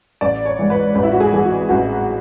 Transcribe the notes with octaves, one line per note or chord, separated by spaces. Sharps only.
A1 D5
C#5
G#2 E3
B4
A1 B4
E4
F#4
G#4
G#2 E3 G#4
F#4
A1 F#4